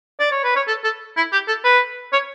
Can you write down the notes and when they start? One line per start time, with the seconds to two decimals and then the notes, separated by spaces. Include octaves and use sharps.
0.20 D5
0.31 C#5
0.44 B4
0.56 C#5
0.68 A4
0.84 A4
1.17 E4
1.33 G4
1.48 A4
1.65 B4
2.13 C#5